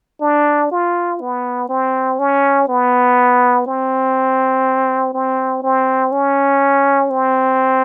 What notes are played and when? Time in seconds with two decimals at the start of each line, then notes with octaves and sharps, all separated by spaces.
0.21 D4
0.72 F4
1.21 B3
1.69 C4
2.19 C#4
2.69 B3
3.66 C4
5.14 C4
5.63 C4
6.12 C#4
7.10 C4